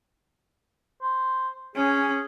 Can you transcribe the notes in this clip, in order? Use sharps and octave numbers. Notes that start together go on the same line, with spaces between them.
C5
C#4 G#4